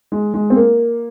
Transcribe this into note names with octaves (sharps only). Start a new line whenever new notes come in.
G#3
G#3
C4
A#3